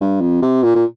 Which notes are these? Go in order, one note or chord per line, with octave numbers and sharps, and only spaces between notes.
G2
F2
C3
A#2
A#2